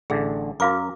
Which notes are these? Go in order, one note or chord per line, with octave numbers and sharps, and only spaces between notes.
A1 D3 G#4
F#2 F#4 A#4 F5 D6